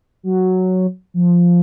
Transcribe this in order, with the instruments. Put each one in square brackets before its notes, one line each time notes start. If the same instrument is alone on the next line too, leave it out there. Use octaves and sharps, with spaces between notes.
[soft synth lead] F#3
F3